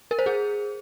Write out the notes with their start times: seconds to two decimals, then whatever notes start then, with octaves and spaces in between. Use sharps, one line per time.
0.11 A#4
0.19 C5
0.26 G#4